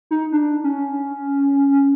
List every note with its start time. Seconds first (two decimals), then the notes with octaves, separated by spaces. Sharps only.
0.11 D#4
0.32 D4
0.64 C#4